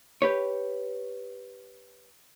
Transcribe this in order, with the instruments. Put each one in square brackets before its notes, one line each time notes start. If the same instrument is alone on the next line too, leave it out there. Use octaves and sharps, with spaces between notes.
[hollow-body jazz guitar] G4 B4 C#5